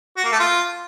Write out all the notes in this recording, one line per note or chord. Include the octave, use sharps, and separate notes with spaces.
F#4
A#3
A3
F4